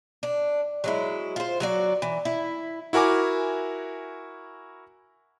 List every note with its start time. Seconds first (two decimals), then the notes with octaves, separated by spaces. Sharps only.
0.23 D4
0.84 F#3 G#3 E4
1.36 F4 C5
1.60 F#3 F#4 D5
2.02 E3
2.25 E4
2.93 E4 F#4 A#4 G#5 D6